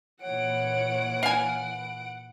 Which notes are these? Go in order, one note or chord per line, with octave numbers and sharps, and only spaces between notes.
A#2 E3 C#5 F#5 D7
F5 G#5